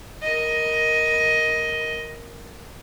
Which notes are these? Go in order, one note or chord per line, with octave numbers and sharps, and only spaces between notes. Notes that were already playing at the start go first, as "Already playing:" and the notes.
A#4 D#5